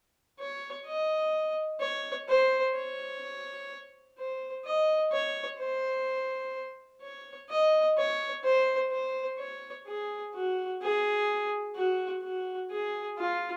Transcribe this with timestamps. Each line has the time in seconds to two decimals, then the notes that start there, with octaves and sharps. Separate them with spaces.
0.39 C#5
0.86 D#5
1.80 C#5
2.29 C5
2.75 C#5
4.19 C5
4.65 D#5
5.12 C#5
5.60 C5
7.02 C#5
7.50 D#5
7.98 C#5
8.44 C5
8.92 C5
9.39 C#5
9.87 G#4
10.35 F#4
10.82 G#4
11.76 F#4
12.23 F#4
12.71 G#4
13.18 F4